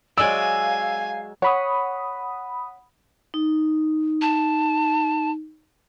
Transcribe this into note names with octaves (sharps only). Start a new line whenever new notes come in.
F#3 G#3 D5 F5 G#5 E6
C#5 F#5 B5 D#6
D#4
A5